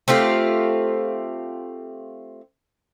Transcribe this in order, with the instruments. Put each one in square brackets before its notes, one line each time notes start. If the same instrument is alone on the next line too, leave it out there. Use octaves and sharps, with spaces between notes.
[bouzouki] A3 C4 F4 G4